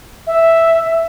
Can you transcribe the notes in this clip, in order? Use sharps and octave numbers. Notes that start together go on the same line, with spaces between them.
E5